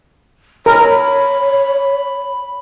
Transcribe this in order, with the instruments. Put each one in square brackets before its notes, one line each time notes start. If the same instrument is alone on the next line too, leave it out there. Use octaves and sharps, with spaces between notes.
[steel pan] A#4 [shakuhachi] C#5 [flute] B5